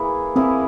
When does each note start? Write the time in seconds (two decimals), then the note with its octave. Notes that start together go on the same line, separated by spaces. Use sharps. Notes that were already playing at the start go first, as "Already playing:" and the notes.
Already playing: E3 A#3 E4 G#4
0.36 E3 A#3 C4 E4 G#4